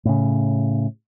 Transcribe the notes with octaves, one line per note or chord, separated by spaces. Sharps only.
A2 C#3